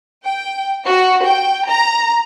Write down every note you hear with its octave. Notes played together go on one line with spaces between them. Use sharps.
G5
F#4
G5
A#5